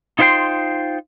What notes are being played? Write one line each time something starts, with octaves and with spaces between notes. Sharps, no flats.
D#4 F4 C5 E5 G5 C6